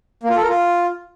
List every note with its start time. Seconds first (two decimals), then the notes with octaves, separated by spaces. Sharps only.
0.23 A#3
0.30 F4
0.36 A4
0.43 A#4
0.49 F4